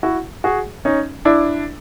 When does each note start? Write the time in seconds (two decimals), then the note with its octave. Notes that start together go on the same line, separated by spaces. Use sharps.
0.03 E4 F#4
0.44 F#4 G#4
0.85 C#4 D#4
1.25 D4 E4